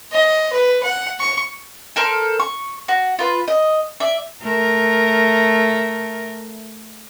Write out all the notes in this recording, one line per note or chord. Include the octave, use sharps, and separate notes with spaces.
D#5
B4
F#5
C#6
A4 A#4 C5 F6
C#6
F#4
F4 B4
D#5
D5 E5
A3 A#4